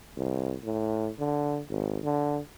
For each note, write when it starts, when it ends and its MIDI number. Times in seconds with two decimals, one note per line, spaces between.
0.17 0.55 36
0.64 1.10 45
1.19 1.60 50
1.69 1.99 32
2.03 2.40 50